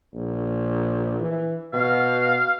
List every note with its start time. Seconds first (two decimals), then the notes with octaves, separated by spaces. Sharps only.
0.13 A#1
1.19 E3
1.73 B2 F5